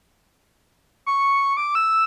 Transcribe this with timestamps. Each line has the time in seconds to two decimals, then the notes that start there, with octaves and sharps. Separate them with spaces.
1.06 C#6
1.57 D6
1.75 E6